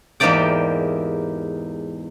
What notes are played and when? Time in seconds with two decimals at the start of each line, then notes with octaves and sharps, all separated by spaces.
0.20 E2 G#2 A#3 G4 D5 G5